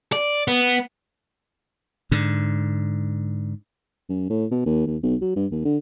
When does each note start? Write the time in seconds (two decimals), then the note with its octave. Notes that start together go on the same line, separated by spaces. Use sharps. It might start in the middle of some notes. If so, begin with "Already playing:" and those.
0.12 D5
0.48 B3
2.11 G#2 D3
4.09 F#2
4.30 A2
4.51 B2
4.66 D#2
4.87 D#2
5.03 B1
5.21 F#3
5.36 G2
5.52 D#2
5.65 D3